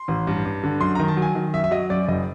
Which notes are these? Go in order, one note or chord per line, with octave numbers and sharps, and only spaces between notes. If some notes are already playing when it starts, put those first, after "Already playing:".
Already playing: C6
A1
G2
G2
D3
F#2 C6
D#3 A#5
A5
F#3
G#5
D#3
F#2 E5
E5
F#3 D#5
F#2 D5
F#1 D#5